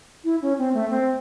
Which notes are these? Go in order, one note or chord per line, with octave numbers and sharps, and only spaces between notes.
E4
C#4
C4
A3
C4